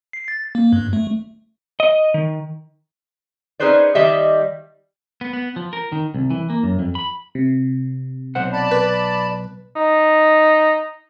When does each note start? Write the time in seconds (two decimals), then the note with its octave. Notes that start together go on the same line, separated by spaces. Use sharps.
0.13 C7
0.28 A6
0.55 A#3
0.73 G2
0.93 A3
1.80 D#5
2.14 D#3
3.60 C#4 D#4 G#4 B4 C5 D5
3.95 D#3 G3 G4 D#5 E5
5.21 B3
5.33 B3
5.56 F3
5.73 A#4
5.92 D#3
6.14 C2
6.30 E3
6.50 A#3
6.63 F#2
6.79 F2
6.95 B5
7.35 C3
8.35 B1 C5 F#5
8.52 D5 A5 B5
8.71 B4
9.75 D#4